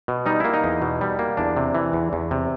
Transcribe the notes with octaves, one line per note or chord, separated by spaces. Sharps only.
B2
G3 D#4
A#3 E4
D#4
E2
B2
G3
A#3
E2 D4
C3
E3
E2
E2
C3